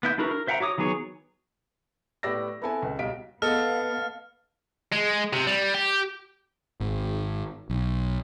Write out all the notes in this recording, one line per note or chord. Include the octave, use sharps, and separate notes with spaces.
B3 E4 G6
D4 E4 F#4 A#4 B4
A#4
C5 E5 F#5 G5 A#5
F#4 C#5 D6 D#6
D#3 F#3 B3 G#4 C#5
A2 B3 G4 D5 E6 A#6
B3 C4 E4 A4 B4 G#5
C#2
B1 G3 D#5 F5 B6 D7
B3 A4 D#5 F5 F6
G#3
C3
G3
G4
G#1
B1